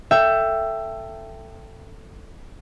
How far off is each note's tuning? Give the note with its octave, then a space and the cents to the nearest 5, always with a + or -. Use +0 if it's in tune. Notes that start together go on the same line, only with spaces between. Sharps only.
A4 +15 E5 +15 G5 +0